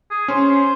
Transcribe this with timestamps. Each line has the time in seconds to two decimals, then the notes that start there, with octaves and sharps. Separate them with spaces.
0.10 G#4
0.28 C#4 C5